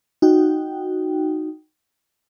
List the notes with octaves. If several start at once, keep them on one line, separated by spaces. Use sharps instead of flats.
D#4 F#4 G5